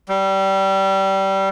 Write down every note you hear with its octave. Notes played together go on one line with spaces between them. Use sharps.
G3